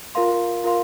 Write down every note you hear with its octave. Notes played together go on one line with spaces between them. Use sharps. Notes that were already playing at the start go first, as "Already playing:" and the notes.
F4 A#4 F5 C6
F4 A#4 F5 C6